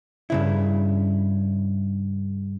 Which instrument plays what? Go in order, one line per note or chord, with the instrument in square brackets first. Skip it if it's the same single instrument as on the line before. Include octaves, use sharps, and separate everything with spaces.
[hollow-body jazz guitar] G2 C#3 E4